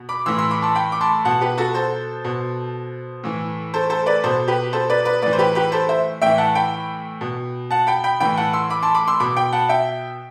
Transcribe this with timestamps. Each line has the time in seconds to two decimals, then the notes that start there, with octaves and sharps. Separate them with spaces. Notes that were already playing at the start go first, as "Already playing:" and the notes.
Already playing: B2
0.09 B5 D6
0.26 A2 E3 C6 E6
0.38 C6 E6
0.51 B5 D6
0.62 A5 C6
0.75 G5 B5
0.92 D6
1.01 A5 C6
1.25 B2 F#5 A5
1.41 G4 B4
1.58 F#4 A4
1.75 A4 C5
2.25 B2
3.24 A2 E3
3.74 A4 C5
3.90 A4 C5
4.06 B4 D5
4.23 B2 A4 C5
4.48 G4 B4
4.73 A4 C5
4.90 B4 D5
5.05 B4 D5
5.22 A2 E3 B4 D5
5.33 C5
5.38 G4 B4
5.55 G4 B4
5.72 A4 C5
5.89 C5 E5
6.22 A2 E3 E5 G5
6.38 F#5 A5
6.55 G5 B5
7.21 B2
7.71 F#5 A5
7.87 G5 B5
8.04 G5 B5
8.20 A2 E3 G5 B5
8.37 F#5 A5
8.53 C6 E6
8.70 B5 D6
8.83 A5 C6
8.94 B5 D6
9.07 C6 E6
9.20 B2 B5 D6
9.36 G5 B5
9.52 F#5 A5
9.69 E5 G5